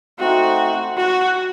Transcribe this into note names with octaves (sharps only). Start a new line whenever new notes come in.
A3 C4 D#4 F#4
F#4